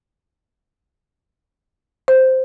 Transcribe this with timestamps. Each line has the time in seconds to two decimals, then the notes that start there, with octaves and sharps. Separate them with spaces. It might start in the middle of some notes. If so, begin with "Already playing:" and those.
2.08 C5